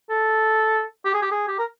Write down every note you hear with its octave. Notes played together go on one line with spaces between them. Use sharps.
A4
G4
G#4
G4
G#4
G4
A#4